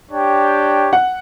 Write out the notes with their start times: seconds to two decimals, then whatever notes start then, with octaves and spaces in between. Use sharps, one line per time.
0.10 D4 G4 C#5 G5
0.93 F#5